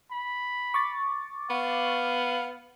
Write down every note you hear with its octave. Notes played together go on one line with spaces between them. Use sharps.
B5
C#6 D6 A6
B3 F5